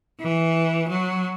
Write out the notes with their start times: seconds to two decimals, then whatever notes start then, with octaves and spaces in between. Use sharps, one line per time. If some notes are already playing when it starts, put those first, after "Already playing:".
0.21 E3
0.90 F#3